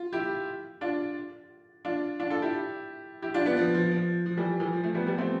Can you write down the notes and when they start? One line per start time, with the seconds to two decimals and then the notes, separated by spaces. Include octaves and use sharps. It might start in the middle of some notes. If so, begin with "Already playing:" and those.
Already playing: F4
0.13 E4 G4
0.81 D4 F4
1.85 D4 F4
2.20 D4 F4
2.30 F4 A4
2.42 E4 G4
3.22 E4 G4
3.34 D4 F4
3.46 B3 D4
3.57 F3
3.74 F3
3.91 F3
4.26 F3
4.37 E3 G3
4.60 E3
4.72 F3
4.83 F3 A3
4.94 G3 B3
5.07 G3 B3
5.18 A3 C4